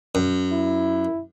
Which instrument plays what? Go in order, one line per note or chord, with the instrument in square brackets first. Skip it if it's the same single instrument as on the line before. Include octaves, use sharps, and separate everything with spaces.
[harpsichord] F#2
[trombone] E4